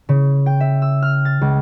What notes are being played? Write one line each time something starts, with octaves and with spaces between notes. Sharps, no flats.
C#3
G5
E5
E6
F6
A6
C#2